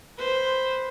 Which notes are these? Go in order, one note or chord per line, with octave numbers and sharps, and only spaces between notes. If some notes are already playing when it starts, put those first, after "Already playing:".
B4 C5